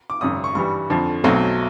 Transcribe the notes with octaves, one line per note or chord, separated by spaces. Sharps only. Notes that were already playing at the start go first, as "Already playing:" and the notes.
D6
G#1 F#2 C#3 D#6
C#6
G2 E3 G3 C#6
F2 D3 F3
B1 B2 F#3 A3 C4